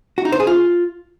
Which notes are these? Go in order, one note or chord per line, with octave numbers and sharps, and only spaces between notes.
F#4
D#4
C5
G#4
F4